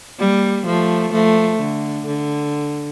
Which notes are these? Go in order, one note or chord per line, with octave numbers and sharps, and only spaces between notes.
G3 A#3
F3 A3
F3 A3
D3
D3